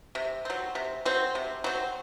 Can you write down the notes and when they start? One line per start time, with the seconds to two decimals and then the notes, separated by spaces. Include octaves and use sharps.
0.15 C3
0.45 F#3 C4
0.75 C3
1.05 F#3 C4
1.35 C3
1.64 F#3 C4